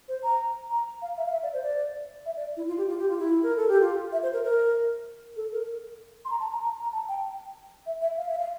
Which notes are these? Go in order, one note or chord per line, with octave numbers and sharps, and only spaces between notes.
C5
A#5
A#5
F5
E5
F5
E5
D5
C5
D5
E5
D5
E4
F4
G4
F4
G4
F4
E4
A#4
A4
G4
F4
E5
C5
A#4
A#4
A4
A#4
C6
A#5
A5
A#5
A#5
A#5
A5
G5
E5
E5
F5
E5
F5